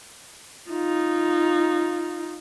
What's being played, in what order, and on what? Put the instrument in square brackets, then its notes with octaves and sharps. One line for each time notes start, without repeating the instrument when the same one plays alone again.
[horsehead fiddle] D#4 F4